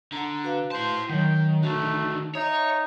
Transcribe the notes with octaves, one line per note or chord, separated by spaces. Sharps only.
D3 F#5 A5 A#5
F#4 B4 F5
E4 C5 A5
D#3 F#3 C#5 G5
D3 D#3 A3 F#4
D#4 C#5 E5